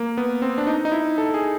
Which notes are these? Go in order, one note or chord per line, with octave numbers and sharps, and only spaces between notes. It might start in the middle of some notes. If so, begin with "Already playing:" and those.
Already playing: A#3
B3
C4
D4
D#4
D#4
E4
A4
G#4